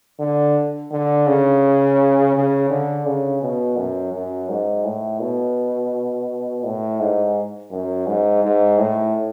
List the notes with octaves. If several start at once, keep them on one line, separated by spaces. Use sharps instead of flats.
D3
D3
C#3
C#3
D3
C#3
B2
F#2
F#2
G#2
A2
B2
A2
G#2
F#2
G#2
G#2
A2